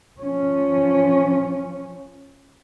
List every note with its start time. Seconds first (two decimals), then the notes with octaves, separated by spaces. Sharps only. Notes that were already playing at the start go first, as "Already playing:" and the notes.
0.20 F3 C#4